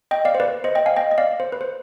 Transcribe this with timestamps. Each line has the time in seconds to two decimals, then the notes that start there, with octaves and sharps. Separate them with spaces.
0.11 D#5 G5
0.25 D5 F5
0.35 C5
0.40 B4 D5
0.64 C5 D#5
0.75 D#5 G5
0.86 F5 G#5
0.96 D#5 G5
1.11 D#5
1.18 D5 F5
1.40 C5
1.52 B4
1.61 C5